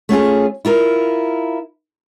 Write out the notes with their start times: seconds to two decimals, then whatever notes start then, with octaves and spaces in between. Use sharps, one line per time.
0.09 A3 C#4 F4 G#4
0.65 E4 F4 A#4